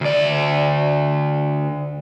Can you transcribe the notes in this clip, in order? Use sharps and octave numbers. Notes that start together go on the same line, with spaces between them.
D2 D5